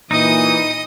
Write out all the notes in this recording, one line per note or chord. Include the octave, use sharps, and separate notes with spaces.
A#2 E3 D#4 D#5 D#6